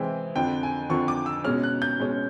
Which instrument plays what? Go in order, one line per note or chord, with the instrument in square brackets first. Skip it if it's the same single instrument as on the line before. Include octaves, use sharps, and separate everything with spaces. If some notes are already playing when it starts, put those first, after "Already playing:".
Already playing: [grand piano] C3 E3 G#3 C4 E4 G5
F2 D3 F3 G5
G#5
F2 D3 F3 C#6
D6
E6
B2 G#3 C#4 F6
F#6
G6
B2 G#3 C#4